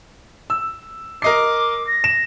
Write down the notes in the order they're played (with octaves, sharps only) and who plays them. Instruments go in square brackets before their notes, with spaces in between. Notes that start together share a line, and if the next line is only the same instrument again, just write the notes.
[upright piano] E6
[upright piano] A#4 D#5 C7 [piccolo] D6
[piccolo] A#6
[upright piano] E7